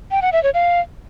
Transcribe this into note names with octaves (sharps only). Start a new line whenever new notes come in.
G5
F#5
E5
C#5
F5